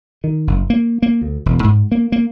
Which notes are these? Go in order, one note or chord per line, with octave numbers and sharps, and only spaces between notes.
D#3
F#1
A#3
A#3
D2
E1
G#2
A#3
A#3